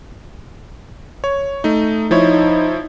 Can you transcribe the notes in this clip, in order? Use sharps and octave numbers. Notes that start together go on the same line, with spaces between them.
C#5
A3 D#4
F3 D#4 E4 C#5